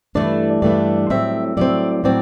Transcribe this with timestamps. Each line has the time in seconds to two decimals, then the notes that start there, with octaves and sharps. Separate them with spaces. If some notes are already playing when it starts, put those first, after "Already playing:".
0.15 G2 E3 A3 D4 D5
0.62 G2 E3 A3 D4 D5
1.10 A2 F#3 C4 E5
1.57 A2 F#3 C4 D5
2.04 A2 F#3 C4 D5